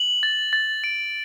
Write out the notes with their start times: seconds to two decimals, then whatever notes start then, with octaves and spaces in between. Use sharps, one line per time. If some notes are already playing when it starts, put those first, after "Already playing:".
Already playing: F#7
0.23 A6
0.53 A6
0.84 D7